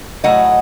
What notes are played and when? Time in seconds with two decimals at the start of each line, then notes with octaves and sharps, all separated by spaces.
0.24 A2 F#3 A3 D#5 F#5